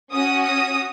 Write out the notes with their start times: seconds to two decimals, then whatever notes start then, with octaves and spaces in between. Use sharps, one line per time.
0.13 C#4 F#4 D#6
0.44 D#6